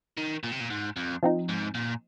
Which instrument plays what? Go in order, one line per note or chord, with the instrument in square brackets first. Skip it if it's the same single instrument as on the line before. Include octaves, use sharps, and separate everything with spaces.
[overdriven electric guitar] D#3
A#2
C3
A#2
G#2
F2
[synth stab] F3 C4 D#4
[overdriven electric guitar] G#2
A#2